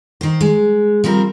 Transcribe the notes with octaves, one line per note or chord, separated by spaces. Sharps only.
D#3 C5
G#3
F3 G3 C4 A#4